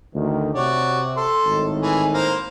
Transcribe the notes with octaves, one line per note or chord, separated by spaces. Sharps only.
D2 D#3
C3 F#4 C#5 D5
A4 C6
G#1 A2 D#3
E3 G#4
A#3 A#4 C5